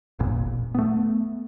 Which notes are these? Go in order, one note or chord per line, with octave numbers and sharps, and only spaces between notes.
D1 G#1 E2 A#2
A3 B3